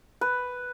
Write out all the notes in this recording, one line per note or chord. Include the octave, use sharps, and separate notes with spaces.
B4